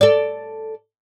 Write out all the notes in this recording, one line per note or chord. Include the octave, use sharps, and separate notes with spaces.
A4 D5